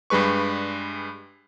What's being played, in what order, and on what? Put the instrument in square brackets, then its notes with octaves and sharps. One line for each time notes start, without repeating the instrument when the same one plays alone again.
[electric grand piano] G2 G3 G#3 B4 C#6